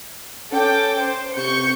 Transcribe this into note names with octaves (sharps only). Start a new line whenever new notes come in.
C#4 A4 G5 D6
C5
C3 C#6 G6 C#7